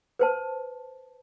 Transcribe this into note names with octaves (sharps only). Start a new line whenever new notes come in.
B4 C5 A5